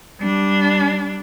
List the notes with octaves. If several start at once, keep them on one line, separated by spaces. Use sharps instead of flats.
G3 D4